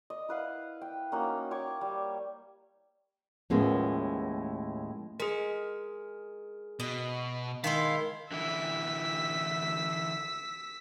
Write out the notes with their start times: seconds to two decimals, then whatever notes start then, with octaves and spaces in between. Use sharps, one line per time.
0.10 D#5
0.29 E4 B4 F5 F#5
0.81 G5
1.12 A#3 C#4 D#4 F#4
1.51 C#5 G5 C#6 D6
1.81 G3
3.50 D#2 A2 F3 G#3 B3 C#4
5.20 G#3 G#4 A#4
6.80 B2 D#5
7.64 D#3 G#3 E4 F5 C6 B6
8.32 D3 E3 E4 E6 B6